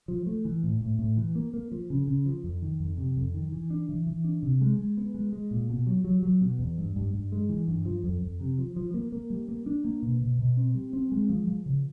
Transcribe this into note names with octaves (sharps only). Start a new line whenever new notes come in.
F3
A3
E3
A2
A2
A2
E3
A#3
A#3
F3
C#3
C#3
F3
F2
D#3
F2
C3
F2
D#3
E3
D4
E3
E3
D4
C3
G#3
G#3
B3
G#3
G#3
A#2
B2
F#3
F#3
F#3
B2
E2
G2
G2
G2
G#3
E3
G2
F3
F2
F2
C3
F3
F3
A#3
A#3
G3
A#3
D4
A#3
B2
B2
B2
C4
G3
C4
G#3
F3
F3
C#3